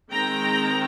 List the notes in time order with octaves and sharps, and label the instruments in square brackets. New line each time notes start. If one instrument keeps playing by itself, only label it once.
[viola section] D#3 G#3 C4 G5 A#5